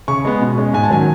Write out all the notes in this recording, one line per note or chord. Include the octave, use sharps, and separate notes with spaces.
C#3 C#6
G#3 B3
B2
G#3 C#4
G#2 G#5
A5
D#3 F#3 C#4 G#5